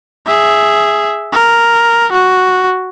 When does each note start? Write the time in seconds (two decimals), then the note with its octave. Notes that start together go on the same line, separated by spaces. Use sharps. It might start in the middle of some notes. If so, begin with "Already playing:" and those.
0.26 G#4 E5
1.32 A#4
2.12 F#4